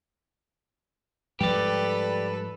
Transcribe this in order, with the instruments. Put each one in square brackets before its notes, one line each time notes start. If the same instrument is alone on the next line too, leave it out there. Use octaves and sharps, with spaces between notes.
[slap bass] G#2 F3 G3 [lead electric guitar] G4 D5 [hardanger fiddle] A4 B4